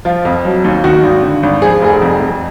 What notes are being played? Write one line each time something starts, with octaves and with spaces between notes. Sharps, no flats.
F3 F4
F2
F#3
D#2
D#3 F#4
G#1
D3
G#1
F3 G#4
F1 G#4
F2
F2